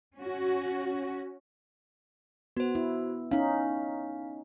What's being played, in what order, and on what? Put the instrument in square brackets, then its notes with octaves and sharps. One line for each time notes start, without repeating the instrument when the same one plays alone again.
[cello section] C#4 F#4
[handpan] B3 [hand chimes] F#4 C5
[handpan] E4
[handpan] C#4 D#4 [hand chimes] F5